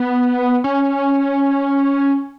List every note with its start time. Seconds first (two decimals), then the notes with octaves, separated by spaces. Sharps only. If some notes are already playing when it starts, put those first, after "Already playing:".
Already playing: B3
0.64 C#4